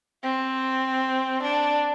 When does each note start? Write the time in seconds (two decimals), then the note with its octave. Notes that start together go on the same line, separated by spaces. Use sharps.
0.23 C4
1.43 D4